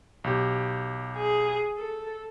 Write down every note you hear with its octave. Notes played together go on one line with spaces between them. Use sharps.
B1 G4
G#4
A4